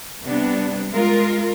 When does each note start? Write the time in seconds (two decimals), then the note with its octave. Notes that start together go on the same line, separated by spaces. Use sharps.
0.24 C3 G3 B3 D4
0.90 G#3 F4 A#4